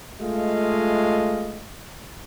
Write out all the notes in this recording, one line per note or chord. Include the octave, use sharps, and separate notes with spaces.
G#3 A3 F4 D#5 F5